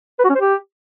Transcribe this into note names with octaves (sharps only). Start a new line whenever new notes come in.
B4
F#4
C#4
C5
G4